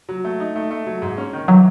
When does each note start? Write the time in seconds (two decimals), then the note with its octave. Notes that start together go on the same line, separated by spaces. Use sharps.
0.09 F#3
0.25 A3
0.40 D#4
0.55 A3
0.71 A3
0.86 F#3
1.02 G#2
1.18 C#4
1.33 D#3
1.48 E3 F#3